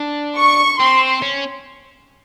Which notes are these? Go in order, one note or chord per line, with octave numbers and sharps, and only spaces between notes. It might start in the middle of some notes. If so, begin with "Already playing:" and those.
Already playing: D4
C#6
C4 C6
C#4